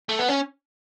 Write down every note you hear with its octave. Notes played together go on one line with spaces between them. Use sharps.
A3
B3
C#4